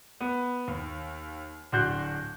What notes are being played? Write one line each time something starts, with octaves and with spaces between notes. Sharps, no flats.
B3
D#2
D1 D4 F#4 C6 F#6 G6